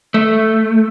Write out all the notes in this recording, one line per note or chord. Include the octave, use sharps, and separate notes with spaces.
A3